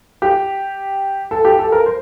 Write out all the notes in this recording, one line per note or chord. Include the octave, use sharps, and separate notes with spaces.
G4
A4
G4
A4
A#4
C5